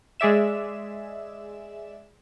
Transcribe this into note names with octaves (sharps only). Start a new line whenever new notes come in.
G#3 G#4 D5 E5 E7